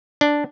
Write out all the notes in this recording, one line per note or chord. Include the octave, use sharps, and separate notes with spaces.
D4